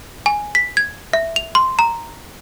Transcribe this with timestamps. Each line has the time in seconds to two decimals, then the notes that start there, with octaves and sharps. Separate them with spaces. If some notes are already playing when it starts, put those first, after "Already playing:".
0.26 G#5
0.55 B6
0.77 G#6
1.13 E5
1.36 F7
1.55 C6
1.79 A#5